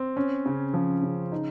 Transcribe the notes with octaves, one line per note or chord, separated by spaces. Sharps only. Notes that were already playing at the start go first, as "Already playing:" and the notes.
Already playing: C4
C#4
C#3
F3
C#3
D#4